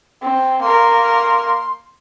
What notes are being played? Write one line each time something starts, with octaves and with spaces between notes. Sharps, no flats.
C4
A#3 A#4 C6